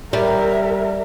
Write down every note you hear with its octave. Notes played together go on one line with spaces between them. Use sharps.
G3 A#4 E5